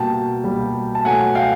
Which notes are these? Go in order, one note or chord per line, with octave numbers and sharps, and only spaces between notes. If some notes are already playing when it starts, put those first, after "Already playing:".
Already playing: B2 G3 A#3 G5 A5
B2 G3 A#3
A5
B2 F#3 A3 F#5 G#5
F5 G5